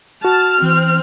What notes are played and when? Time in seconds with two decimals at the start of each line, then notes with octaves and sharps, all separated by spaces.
0.24 F#4 A5 F6
0.62 E3 C4